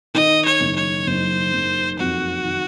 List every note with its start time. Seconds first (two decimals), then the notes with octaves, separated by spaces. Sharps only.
0.14 D#3 D#5
0.45 C#5
0.60 F#1
0.76 C#5
1.07 F#1 C5
1.53 F#1
1.99 F2 F#4
2.45 D#3